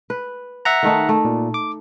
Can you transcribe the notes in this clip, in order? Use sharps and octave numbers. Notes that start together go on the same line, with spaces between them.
B4
E5 F#5 A#5
D#3 A3 D#4
A3
A#2
D6